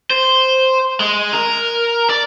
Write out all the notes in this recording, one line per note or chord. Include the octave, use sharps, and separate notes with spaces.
C5
G#3
A#4
D5